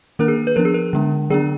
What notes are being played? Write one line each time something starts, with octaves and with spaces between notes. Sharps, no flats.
D#3 A#3 D4 A#4
G#4
B4
F3 B3 D4 A#4
G#4
A#4
D3 G#3 B3 D4
D3 F#3 B3 D4 G#4